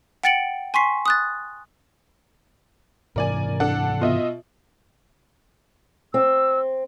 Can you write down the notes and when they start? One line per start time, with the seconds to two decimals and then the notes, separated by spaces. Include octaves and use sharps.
0.23 F#5 G5 A6 C#7 D7 F#7
0.74 G#5 C6 C#6 B6 C7
1.06 D#6 F#6 A6
3.16 G#2 C3 E3 A#4 D5 G#5
3.60 D4 A4 F#5
4.01 B2 F4 D#5 E5
6.14 C4 E6